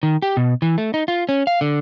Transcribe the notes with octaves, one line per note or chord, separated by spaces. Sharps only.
D#3
G4
B2
E3
A3
D#4
F4
C#4
F5
D3